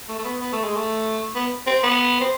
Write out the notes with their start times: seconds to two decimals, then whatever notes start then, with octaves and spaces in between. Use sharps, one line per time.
0.09 A3
0.19 A3
0.24 B3
0.41 B3
0.52 A3
0.64 G#3
0.76 A3
1.35 B3
1.67 C4
1.83 B3
2.21 C4